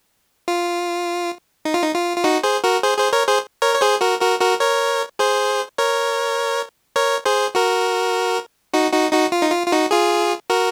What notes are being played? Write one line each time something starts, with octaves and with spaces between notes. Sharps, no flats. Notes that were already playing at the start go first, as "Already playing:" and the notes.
F4
D#4
F4
D#4
F4
F4
D#4 F#4
G#4 C5
F#4 A#4
G#4 C5
G#4 C5
A#4 C#5
G#4 C5
A#4 C#5
C#5
G#4 C5
F#4 A#4
F#4 A#4
F#4 A#4
A#4 C#5
G#4 C5
A#4 C#5
A#4 C#5
G#4 C5
F#4 A#4
D#4 F#4
D#4 F#4
D#4 F#4
F4
D#4
F4
F4
D#4 F#4
F4 G#4
F#4 A#4